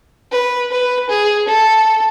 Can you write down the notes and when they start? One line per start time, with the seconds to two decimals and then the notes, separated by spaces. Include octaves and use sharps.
0.31 B4
0.71 B4
1.10 G#4
1.48 A4